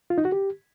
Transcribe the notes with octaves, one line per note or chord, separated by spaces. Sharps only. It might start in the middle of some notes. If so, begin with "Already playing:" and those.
F4
D#4
F#4
G4